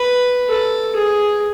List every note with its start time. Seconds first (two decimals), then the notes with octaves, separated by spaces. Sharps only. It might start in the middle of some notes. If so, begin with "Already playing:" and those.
Already playing: B4
0.49 A4
0.95 G#4